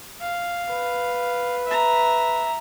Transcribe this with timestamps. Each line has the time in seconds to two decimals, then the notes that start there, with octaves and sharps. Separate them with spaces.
0.21 F5
0.70 B4
1.66 E5 A#5